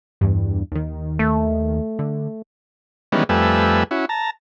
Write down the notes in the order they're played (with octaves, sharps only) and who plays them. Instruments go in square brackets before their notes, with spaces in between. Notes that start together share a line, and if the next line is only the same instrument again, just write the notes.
[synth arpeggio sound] E2 G2
D#2 D#3
[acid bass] A3
[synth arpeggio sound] D3
[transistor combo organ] D#3 E3 G3 G#3 B3 C#4
F2 G3 A3 B4 G#5 E6
C#4 E4 F#4
A5 A#5